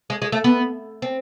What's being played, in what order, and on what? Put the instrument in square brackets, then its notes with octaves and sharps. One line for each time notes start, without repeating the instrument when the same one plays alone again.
[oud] G#3
G#3
A3
B3
C4